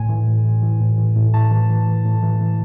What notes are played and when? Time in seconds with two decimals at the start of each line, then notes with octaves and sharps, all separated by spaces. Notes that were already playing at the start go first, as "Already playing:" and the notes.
Already playing: A2 G#5
0.09 E3
0.27 A2
0.45 E3
0.62 E3
0.80 A2
0.98 E3
1.16 A2
1.34 A2 A5
1.51 E3
1.69 E3
1.87 E3
2.05 A2
2.23 E3
2.41 E3